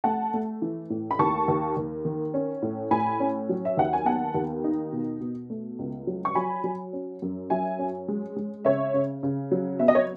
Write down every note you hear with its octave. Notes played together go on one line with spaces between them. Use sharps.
A3 F#5 A5
A3
E3
A2
B5
D#2 A5 C#6
D#2
D#2
D#3
C#4
A2
A2 G#5 B5
C#4
F#3
E5
D#2 F#5
G#5
B3 F#5 A5
D#2
D#4
B2
B2
A3
C#2
F#3
C#6
F#3 G#5 B5
F#3
C#4
F#2
F#3 E5 G#5
C#4
G#3
G#3
C#3 C#5 E5
C#3
C#3
F#3
B3 E5
D#5
C#5